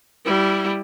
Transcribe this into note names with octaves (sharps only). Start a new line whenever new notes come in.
G3 E4